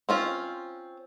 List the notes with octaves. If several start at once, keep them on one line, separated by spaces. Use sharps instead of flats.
C4 C#4 F4